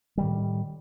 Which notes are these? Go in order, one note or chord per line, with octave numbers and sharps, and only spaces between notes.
A2 D#3 G3